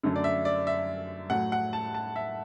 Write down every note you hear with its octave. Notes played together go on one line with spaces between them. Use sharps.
F#2 D3 F#3 A3
D5
E5
D5
E5
A2 F#3 A3 F#5
F#5
A5
A5
E5